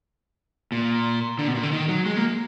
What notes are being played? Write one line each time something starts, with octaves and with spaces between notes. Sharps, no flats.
A#2
D3
B2
A#2
D3
D#3
F#3
G#3
A#3